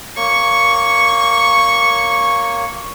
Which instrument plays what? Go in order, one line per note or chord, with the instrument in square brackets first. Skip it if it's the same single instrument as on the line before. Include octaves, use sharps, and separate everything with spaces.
[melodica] A#3 C#5 [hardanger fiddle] C#6